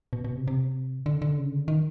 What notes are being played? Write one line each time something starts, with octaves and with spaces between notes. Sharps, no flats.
B2
B2
C3
C3
D3
D3
C#3
D3
D#3